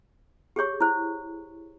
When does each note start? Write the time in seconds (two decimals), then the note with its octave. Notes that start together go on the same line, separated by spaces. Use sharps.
0.56 G4 G#4 C#5 C#6
0.81 E4 C5